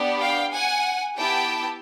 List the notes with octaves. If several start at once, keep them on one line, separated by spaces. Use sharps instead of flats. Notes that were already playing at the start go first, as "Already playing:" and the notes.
Already playing: B3 D4 G4
F5 G5
F#5 G#5
B3 E4 G4 G5 A5